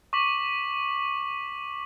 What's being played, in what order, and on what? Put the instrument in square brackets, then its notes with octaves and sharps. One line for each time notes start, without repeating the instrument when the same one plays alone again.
[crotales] C#6 D6 B6 F#7